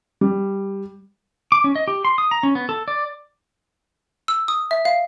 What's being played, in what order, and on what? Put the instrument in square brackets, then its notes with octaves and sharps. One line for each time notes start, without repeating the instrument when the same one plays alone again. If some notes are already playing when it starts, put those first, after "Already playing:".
[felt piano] G3
[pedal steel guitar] D6
C#4
D#5
G4
C6
D#6
A#5
C#4
B3
A4
D5
[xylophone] E6
D#6
E5
F5